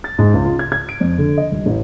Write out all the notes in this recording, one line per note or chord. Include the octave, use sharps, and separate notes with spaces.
A6
G#2
C#2
F4
G#6
G#6
D7
F2
D3
D#5
D#1
A1